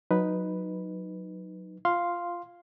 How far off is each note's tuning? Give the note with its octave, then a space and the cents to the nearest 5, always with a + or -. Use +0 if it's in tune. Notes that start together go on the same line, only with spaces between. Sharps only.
F#3 -10 D#4 +0 B4 +0
F4 -10 F5 +0 C6 +0